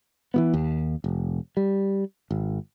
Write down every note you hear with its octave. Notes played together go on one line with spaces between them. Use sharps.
E3 F3 B3
D#2
F1
G3
G#1